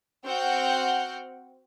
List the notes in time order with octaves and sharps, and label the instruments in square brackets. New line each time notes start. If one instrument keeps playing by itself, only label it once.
[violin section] C4 F#4 F#5 G5 F6 G6